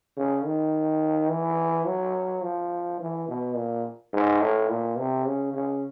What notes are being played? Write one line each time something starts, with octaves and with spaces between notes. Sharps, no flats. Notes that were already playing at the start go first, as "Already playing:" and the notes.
C#3
D#3
E3
F#3
F3
E3
B2
A#2
G#2
A2
A#2
C3
C#3
C#3